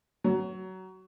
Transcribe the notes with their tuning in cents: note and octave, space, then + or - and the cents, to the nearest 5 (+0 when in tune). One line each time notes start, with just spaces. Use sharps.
F#3 +20